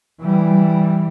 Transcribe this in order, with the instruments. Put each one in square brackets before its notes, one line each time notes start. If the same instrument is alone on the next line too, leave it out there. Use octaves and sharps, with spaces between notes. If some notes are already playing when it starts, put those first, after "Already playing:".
[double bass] E3 G3